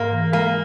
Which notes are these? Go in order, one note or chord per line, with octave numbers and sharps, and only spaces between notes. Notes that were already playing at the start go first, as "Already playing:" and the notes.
Already playing: G#2 A#3
E3
G#3 A#3